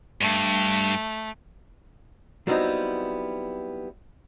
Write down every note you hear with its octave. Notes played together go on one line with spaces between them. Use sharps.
G2 A3
F#3 G3 B3 C4 D#4 E4